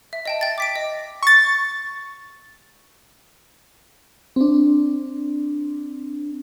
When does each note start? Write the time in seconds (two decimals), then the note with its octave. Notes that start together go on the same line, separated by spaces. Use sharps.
0.13 E5
0.25 D#5 G5 A5
0.41 G5 A6
0.58 D6 B6 D7
0.76 D#5
1.23 C#6 A6
4.36 C4 D4